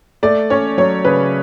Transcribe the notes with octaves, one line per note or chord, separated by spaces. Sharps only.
A3 D5
C#4 C#5
F#3 C#5
C#3 B4